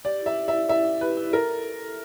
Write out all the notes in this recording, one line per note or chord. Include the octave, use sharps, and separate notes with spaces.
G4 D5
E4 E5
G4
E5
E4
E4 E5
E4
G4 B4
E4
A4 A#4